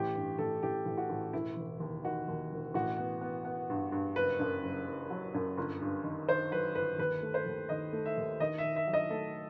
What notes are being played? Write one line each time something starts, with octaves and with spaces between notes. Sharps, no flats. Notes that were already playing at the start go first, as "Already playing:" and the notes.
Already playing: A1 G4
G2
A1 A4
A1 G4
A1
F#4
A1
E1 E4
E1
D#2
D#3 F#4
D#2
E1
A1 F#4
B3
B3
B3
G2
G2
F#1 B4
F#2
F#1
F#1
F#3
F#2
G1
G2
D#3
D#3 C5
F#3 B4
G1 B4
D#2 B4
A3
C5
D#2
D#3 D#5
A3
E5
D#2
D#3 D#5
E5
D#3
E5
F#3
D#5
A3 A4